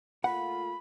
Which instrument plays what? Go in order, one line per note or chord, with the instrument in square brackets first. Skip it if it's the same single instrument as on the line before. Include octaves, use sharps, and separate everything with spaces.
[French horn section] A#2 A3 F4 [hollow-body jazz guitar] F#5 [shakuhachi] B5